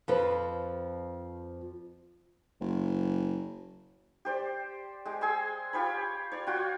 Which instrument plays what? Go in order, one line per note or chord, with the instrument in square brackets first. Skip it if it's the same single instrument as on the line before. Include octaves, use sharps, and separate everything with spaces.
[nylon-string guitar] F2 F3 B4
[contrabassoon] F#1
[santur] G4 C5 D5
G#3 G4
G#4 G#5 C6 E6
F4 G4 C#5 B5
C#5 D5 C6
F4 F#4 G5